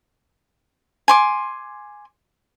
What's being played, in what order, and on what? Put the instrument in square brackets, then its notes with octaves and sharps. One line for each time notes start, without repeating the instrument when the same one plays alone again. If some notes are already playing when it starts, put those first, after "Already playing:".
[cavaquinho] G#5 C6 D6